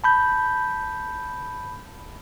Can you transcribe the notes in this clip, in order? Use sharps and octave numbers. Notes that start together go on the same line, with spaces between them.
A5 B5 G6